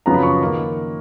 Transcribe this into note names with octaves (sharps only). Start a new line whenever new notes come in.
F#2 C#3 F3 B3 A#5
B5
C#6
D#3 A#3